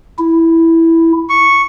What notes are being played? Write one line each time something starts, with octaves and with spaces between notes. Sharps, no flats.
E4
C#6